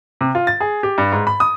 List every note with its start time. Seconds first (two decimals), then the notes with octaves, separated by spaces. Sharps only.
0.21 C3
0.35 F4
0.47 A6
0.60 G#4
0.83 G4
0.98 G2
1.12 G#2
1.27 B5
1.40 D#6